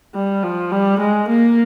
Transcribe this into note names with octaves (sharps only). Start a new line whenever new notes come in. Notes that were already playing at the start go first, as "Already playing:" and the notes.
G3
F3
G3
G#3
A#3